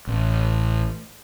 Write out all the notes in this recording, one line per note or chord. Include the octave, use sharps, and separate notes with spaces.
A1